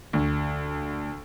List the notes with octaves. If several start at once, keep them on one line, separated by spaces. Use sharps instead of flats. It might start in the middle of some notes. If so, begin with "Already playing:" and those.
D2